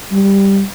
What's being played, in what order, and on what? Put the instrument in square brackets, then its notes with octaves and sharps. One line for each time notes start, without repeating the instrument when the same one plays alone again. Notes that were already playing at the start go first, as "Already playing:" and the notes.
[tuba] G3